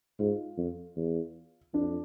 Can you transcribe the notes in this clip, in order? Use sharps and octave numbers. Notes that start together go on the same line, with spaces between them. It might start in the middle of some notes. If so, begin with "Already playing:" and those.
G#2 F4
F2
E2
F2 D4